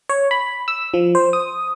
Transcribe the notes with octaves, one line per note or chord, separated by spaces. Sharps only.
C#5
B5
E6
F3
C5
D#6